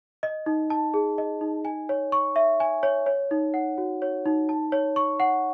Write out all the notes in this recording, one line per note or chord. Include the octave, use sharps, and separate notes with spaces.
D#5
D#4
A5
G#4
D#5
D#4
G#5
C#5
C#6
E5
G#5
C#5
C#5
D#4
F#5
F#4
C#5
D#4
A5
C#5
C#6
F#5